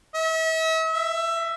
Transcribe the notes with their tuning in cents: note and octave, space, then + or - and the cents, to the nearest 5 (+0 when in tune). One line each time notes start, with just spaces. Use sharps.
E5 -40
E5 +20